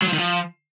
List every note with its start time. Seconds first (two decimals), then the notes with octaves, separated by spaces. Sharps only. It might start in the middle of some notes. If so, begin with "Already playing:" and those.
0.02 F#3
0.08 F3
0.13 D#3
0.19 F3